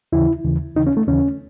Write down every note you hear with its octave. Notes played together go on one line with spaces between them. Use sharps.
D#2 C#3 E3 E4
D#2 C#3 E3
D#2 C#3 E3 D#4
C#4
A3
D#2 C#3 E3 C#4